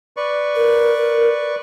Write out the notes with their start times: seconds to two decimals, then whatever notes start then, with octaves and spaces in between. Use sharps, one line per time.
0.17 B4 D5 C#6
0.56 A#4